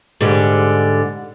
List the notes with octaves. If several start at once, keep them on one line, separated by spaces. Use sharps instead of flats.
G#2 D3 G3